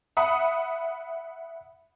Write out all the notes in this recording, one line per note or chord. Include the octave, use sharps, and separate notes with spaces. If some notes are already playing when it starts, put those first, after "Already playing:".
E5 F#5 B5 D#6